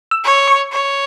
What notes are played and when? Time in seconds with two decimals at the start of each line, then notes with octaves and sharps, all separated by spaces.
0.11 E6
0.24 C#5
0.48 C#6
0.72 C#5